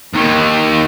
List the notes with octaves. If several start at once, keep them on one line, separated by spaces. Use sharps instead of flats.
D#2 D#3